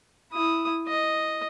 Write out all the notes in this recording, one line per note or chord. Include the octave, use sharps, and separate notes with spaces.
E4 D#6
D#5